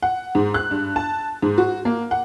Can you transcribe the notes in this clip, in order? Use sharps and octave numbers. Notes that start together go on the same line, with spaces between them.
F#5
G#2
F#6
G2
A5
G#2
F#4
A#3
F#5